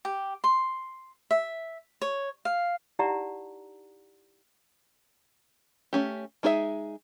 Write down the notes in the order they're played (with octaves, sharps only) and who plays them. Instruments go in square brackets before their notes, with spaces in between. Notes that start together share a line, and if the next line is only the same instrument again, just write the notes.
[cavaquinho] G4
C6
E5
C#5
F5
[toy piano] D#4 E4 G4 D5 F#5 A#5
[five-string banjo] A3 C#4 G4
G#3 D#4 G#4 C5 E5